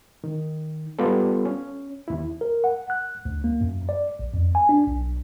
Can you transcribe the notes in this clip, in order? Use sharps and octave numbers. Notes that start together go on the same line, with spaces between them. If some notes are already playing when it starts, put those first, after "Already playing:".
D#3
G3 B3 F4 A4
C#4
D#2 E4
A#4
F#5
F#6
D2
A#3
F#2
D5
A#1
F2
G#5
D4
B1